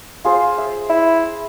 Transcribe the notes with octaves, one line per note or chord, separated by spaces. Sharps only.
F4 G#4 C5
E5
E4